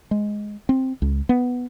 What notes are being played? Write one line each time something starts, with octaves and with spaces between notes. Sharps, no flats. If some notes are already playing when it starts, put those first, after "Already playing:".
G#3
C4
C#2
B3